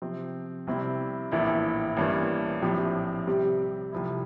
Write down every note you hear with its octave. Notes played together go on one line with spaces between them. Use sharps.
C3 F3 C4
C2 C3 G3 C4 E4
A#1 A2 E3 A#3 E4
A1 G2 E3 A#3
A#1 A2 F3 C4 G4
C3 G3 C4 G4
C2 C3 F3 A3 E4